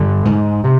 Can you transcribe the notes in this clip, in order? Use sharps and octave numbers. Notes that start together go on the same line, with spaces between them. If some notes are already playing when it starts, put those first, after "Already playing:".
Already playing: G2 D3
G#2
C3